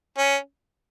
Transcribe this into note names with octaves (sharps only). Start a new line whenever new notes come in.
C#4